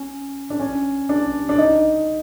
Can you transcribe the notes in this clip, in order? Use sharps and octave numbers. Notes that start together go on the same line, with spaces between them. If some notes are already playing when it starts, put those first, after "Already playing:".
Already playing: C#4
D4
C#4
D4
D4
D#4